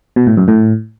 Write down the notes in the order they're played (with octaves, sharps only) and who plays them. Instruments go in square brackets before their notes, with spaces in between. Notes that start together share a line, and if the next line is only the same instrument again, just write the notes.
[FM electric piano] B2
A2
F#2
A2